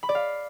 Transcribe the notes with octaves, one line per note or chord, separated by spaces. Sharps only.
B5
D5
F5